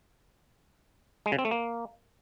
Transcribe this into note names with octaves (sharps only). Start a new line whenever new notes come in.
G#3
C#3
C4
A3
A#3